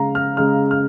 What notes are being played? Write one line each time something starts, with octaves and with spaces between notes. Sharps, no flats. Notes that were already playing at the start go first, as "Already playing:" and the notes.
Already playing: C#3 G#3 F5 A#5
F6
C#3 G#3 F6
F6